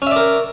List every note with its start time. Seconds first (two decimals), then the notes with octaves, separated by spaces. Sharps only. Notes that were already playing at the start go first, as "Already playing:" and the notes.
0.02 C#4
0.07 E5
0.11 D5
0.16 A#4